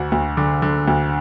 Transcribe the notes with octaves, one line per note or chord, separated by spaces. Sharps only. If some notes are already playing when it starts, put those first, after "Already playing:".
Already playing: D2 D3 F#4
D2
D3
D3
D2